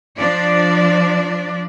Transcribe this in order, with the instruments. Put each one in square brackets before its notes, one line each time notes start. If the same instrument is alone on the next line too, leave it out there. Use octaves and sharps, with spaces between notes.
[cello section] F3 D4 D5